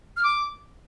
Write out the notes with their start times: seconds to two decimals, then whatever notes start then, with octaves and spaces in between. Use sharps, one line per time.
0.17 F6
0.23 D6